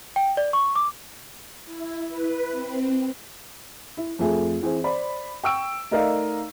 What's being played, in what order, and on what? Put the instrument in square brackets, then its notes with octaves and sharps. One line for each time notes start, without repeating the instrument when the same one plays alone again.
[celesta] G5
D5
C#6
D6
[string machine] E4
B4
C4
[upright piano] E4
F2 F3 A3 G#4
E3 C4 G#4
C5 D5 B5
G5 C#6 E6 D7
A3 D#4 A#4 D5 D#5 F5